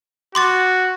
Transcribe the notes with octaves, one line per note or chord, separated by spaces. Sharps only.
F#4 C6 D6 A6